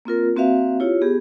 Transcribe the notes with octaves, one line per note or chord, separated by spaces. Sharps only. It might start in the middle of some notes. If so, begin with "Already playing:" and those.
A#3 C4 F4 A#4
A#3 C4 F#4 B4 E5 F5
E4 F4 G4 C#5
B3 G4 G#4